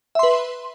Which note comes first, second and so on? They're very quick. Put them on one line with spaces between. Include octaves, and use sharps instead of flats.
E5 C6 B4